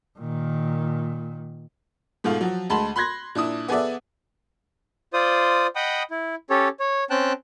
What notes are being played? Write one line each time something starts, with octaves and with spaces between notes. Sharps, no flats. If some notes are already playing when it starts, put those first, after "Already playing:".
A#2 D#3
G#2 B2 A3 F4
F3 F#3
D2 G#3 A5 B5 C6
B5 C6 F#6 G#6 A#6
A#2 D4 E4 D#6
B3 G#4 A4 D5 E5
F4 C5 D5 D#6
D#5 F#5 G5 B5 D#6
E4
C#4 G4 A4 C#5
C#5
C4 C#4 G5 A5 F#6